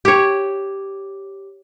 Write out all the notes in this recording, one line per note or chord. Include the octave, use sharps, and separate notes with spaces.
G4 C#5